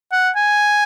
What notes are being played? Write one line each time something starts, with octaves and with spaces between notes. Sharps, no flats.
F#5
G#5